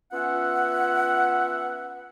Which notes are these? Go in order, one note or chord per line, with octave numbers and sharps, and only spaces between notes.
B3 C#4 F4 E5 F#5